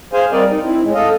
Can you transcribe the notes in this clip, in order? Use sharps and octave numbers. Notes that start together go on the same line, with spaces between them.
G#4 C5 F5 G#5
G3 C4 A#4 D5 D#5
D#4
C4 E4
A2 G#3
A4 D#5 F5